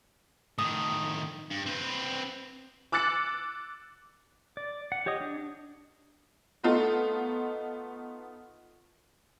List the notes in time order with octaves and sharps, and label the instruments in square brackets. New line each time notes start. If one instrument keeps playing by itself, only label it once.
[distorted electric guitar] A2 D#3 [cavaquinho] D#6
[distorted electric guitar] G2
C4 B4
[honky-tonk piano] D6 E6 F#6 A6 C#7
[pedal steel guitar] D5
F#5
G4 C#5 D#5 D#6
D4
[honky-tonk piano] A3 B3 D#4 F4 A4